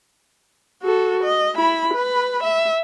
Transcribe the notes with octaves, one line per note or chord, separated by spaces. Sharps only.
F#4 A4
D#5
E4 B5
B4 B5
E5